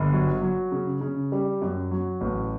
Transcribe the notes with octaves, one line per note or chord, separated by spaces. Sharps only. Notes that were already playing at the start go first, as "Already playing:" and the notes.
Already playing: G1
F#3
F#3
C#3
C#3
G3
F#2
F#3
A1